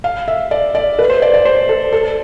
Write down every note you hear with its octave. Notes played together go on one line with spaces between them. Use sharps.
F5
E5
D5
D5
B4
C5
D5
D5
C5
A4
A4